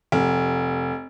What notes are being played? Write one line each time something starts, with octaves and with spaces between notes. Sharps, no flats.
F1